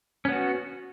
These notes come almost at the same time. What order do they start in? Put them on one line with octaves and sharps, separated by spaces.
C#4 B3 F#4